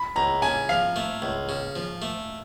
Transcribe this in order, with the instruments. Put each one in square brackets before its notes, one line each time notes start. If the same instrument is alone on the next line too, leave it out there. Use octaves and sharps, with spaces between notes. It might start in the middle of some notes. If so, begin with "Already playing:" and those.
Already playing: [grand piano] B5
[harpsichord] C#2 [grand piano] A#5
[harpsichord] C#3 [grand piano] G#5
[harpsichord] F3 [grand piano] F5
[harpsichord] A3
C#2
C#3
F3
A3